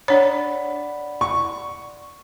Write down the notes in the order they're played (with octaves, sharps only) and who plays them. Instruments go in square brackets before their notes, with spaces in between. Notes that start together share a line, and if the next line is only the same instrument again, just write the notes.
[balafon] D4 C#5 [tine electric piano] D5 F#5 B5
[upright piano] C#6